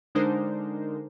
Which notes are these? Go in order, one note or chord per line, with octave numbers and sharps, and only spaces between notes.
D3 G#3 D4 D#4 A#4 C5